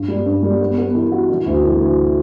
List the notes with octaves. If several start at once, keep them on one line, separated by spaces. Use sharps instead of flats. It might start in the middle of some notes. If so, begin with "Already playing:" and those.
Already playing: G2
G3
G2
G3
B3
B3
E3
F#4
E3
D2
E3
D2